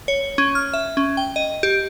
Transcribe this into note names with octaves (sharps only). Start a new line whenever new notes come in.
C#5
C#4
F6
E5
C#4
G5
D#5
G4